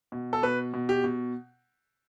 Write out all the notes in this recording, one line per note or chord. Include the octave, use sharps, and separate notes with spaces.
B2
A4
B2 B4
B2
G4
B2